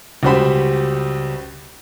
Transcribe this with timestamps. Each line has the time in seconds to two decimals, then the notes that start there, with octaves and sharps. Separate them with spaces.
0.23 C#2 G3 F#4 G4 C5 B5